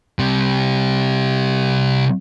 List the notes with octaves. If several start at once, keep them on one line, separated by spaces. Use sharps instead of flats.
C3 G3